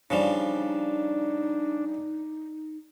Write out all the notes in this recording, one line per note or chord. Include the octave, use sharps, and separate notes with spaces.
C#3 F3 G3 D4 D#4